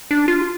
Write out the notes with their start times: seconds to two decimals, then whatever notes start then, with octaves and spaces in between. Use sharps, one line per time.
0.11 D4
0.28 F4